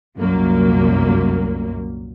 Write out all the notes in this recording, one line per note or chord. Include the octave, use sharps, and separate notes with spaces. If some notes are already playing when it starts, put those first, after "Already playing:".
C2 F#2 A#2 F#3 A#3